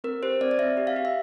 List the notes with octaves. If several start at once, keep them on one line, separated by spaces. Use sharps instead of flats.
C4 A#4
G4 C5
C4 D5
D5
C4 E5
G4
F5
G4
E5